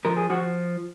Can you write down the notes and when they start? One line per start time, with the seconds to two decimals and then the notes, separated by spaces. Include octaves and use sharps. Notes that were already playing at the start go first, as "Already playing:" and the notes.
0.05 F3 A#4
0.17 G#4
0.30 F3 F#4